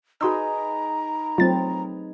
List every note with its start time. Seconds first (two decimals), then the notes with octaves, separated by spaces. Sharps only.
0.21 D#4 F#4 G#4 B4 A#5 C6 E6
1.38 F#3 A3 C4 F4 A6